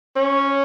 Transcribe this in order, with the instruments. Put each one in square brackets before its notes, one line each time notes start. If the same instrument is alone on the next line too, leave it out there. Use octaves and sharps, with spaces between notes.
[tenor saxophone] C#4